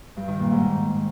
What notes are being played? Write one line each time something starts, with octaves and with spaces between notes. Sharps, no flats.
G2
D#3
A#2
G#2